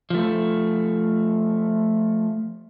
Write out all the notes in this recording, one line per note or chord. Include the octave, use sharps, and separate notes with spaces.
F3 A3